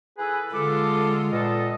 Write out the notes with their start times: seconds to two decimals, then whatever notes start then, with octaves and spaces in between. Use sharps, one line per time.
0.18 E3 G#4 A4 B4
0.54 D3 G#3 F4 A4 D6
1.32 A#2 B3 A4 D#5